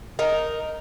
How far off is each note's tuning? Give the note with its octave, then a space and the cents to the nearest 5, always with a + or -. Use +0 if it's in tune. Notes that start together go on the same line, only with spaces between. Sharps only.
D#4 +0 A#4 +0